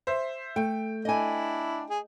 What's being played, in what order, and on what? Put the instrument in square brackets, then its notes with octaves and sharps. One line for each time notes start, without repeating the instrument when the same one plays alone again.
[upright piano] C5 E5
[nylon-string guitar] A3 [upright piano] G5
[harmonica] D4 E4 [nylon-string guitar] D#5 G#5
[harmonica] G#4